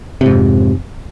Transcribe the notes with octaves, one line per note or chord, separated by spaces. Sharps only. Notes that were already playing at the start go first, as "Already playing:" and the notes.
F2 G#2 C3